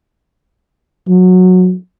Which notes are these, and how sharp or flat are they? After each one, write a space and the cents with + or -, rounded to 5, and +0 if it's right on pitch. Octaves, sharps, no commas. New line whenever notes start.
F#3 -15